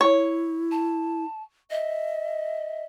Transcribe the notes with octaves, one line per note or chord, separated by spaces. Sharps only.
E4 C#5
A5
D#5 E5